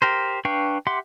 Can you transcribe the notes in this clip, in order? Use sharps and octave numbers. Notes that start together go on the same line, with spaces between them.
G4 A#4 C5
D4 B4 F5 G5 C#6
G4 E5 F#5 C6 D6